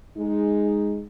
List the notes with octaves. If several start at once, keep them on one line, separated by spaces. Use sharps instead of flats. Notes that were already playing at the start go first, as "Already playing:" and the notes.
G#3 D#4